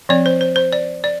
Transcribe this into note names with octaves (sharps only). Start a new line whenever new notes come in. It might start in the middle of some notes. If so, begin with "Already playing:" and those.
F3 C4 D5
C5
C5
C5
D5
D5